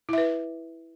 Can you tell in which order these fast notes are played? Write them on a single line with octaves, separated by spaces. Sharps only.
E4 E5 B4